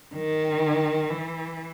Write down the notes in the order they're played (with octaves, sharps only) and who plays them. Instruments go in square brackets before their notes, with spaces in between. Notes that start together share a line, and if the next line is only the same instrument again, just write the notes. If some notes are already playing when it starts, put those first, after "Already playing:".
[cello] D#3
E3